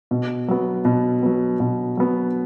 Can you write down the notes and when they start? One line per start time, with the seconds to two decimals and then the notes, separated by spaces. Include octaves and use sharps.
0.11 B2
0.48 F#3 B3
0.85 B2
1.23 F#3 B3
1.60 B2
1.97 F#3 B3